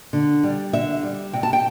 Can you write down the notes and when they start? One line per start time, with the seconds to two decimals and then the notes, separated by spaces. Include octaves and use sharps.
0.13 D3
0.44 G3
0.73 D3 E5
1.03 G3
1.33 C3 G5
1.43 A5
1.53 G5